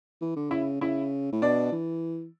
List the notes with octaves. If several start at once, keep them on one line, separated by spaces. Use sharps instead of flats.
E3
D3
C#3 E4 E5
C#3 E4 E5
A2
B2 D4 D5
E3